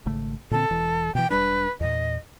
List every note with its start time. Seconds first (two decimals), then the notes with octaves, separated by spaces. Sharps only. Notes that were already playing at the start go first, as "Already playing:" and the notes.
0.06 G#1 C#3 A3
0.51 A#2 D3 C4 A4
0.71 E1 E3
1.15 B2 E3 G5
1.30 E1 G3 D4 B4
1.80 E2 A#2 D#5